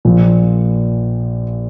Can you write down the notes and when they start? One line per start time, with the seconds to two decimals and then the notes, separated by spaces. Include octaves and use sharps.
0.05 A#1 A#2 F3